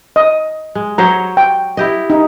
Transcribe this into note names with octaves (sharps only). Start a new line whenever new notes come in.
D#5
G#3
F#3 C5 C#5 A#5
G5
E4 G4 D#5
D#4